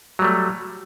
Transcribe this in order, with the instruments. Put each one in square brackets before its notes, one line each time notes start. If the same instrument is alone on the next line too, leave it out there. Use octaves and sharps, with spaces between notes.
[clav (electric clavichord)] F#3
G3
A3